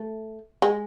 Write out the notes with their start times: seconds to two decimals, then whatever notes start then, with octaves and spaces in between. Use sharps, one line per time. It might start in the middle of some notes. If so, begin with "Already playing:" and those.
Already playing: A3
0.62 G#3